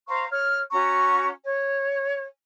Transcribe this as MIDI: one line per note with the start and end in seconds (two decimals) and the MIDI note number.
0.07 0.24 72
0.07 0.24 77
0.07 0.24 82
0.07 0.24 85
0.31 0.59 73
0.31 0.59 89
0.71 1.28 61
0.71 1.28 66
0.71 1.28 82
0.71 1.28 85
1.44 2.22 73